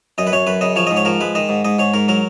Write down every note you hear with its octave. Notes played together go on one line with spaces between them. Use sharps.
F#2 D#5
B4
F#2 C#5
F#2 B4
C#3 D#5
F3 C#5
G#2 D#5
C#5
F3 A#4
G#3 B4
D#3 D#5
G#2
G#2 D#5
G#2 C#5
G#2 A#4
F#3 A#4